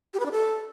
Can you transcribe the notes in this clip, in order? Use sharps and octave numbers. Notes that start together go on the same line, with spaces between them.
G4
B4
D4
A4